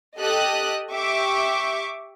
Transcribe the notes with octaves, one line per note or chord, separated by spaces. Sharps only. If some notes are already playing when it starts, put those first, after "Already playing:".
G4 A4 D#5 D#6 F#6
G4 E5 C#6 D6